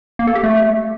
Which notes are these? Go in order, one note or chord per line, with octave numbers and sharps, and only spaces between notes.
A#3
A4
G4
A3